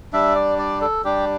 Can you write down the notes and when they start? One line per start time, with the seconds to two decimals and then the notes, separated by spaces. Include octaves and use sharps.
0.13 G3 D4 E5
0.35 D5
0.59 D5
0.81 A4
1.04 G3 D4 G4